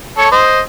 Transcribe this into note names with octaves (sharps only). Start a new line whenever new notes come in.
A4 C#5
C5 D#5